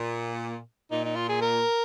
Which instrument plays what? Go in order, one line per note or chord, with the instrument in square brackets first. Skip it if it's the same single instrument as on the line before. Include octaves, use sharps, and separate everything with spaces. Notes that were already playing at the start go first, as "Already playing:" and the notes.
Already playing: [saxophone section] A#2
[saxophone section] A#2 [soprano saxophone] D#4
[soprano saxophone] D#4
F4
G#4
A#4